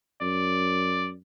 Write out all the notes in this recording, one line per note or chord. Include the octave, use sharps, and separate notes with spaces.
F#2 D5